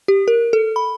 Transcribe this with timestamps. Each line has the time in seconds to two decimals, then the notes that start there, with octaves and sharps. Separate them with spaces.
0.08 G4
0.28 A#4
0.53 A4
0.76 B5